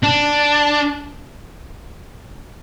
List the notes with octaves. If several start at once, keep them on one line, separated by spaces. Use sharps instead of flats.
D4